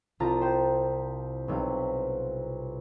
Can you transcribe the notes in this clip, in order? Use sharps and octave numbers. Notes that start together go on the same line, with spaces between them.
C2 F4 A5 A#5 A6
C5 G5
B1 C3 G3 F5